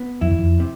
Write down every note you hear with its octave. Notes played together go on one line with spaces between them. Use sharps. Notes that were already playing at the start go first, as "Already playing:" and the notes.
Already playing: B3
F2 E4
E2
F2
C3